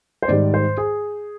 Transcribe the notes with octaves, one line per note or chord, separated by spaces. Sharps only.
C5
G#2 D#3 G3 D5
C5
G#4